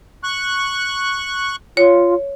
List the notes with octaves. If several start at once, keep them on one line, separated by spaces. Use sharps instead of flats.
C#6 F#6
F4 C#5